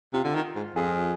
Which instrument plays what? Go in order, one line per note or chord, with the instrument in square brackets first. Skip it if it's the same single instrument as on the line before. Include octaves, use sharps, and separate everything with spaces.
[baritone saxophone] C3 [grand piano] F4
[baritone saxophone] D3
D#3
G#2
[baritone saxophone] F2 [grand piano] F4 G#4